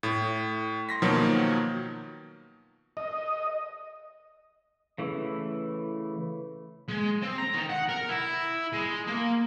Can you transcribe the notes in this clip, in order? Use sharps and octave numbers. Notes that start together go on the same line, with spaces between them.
A2
C6 A#6 B6
B2 D#3 F3 F#3 A#3
D#5
C#3 E3 A3
G#3
C4
A#5
D#3
F#5
A#4
E4
G#3
A#3